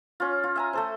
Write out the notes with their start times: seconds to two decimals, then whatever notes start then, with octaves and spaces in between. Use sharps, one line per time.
0.20 C#4 F4
0.44 F4
0.56 E5 G#5 A#5
0.73 A3 A4 C5